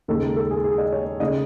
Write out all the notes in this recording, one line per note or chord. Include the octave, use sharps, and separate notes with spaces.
D#2 C#3 G#3 D#4 A4
A4
G#4
G#4
D#5
C#5
C#3 G#3 D#4 D#5